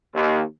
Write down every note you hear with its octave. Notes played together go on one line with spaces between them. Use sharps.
D#2